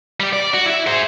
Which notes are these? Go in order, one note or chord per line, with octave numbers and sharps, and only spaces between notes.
G3 G4
D5
F#4
E4 E5
G#4 C5